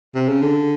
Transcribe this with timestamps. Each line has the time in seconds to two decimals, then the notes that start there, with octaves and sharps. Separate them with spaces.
0.15 C3
0.29 C#3
0.42 D3